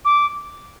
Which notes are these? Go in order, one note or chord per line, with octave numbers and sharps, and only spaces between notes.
D6